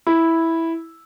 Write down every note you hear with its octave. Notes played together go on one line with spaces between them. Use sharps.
E4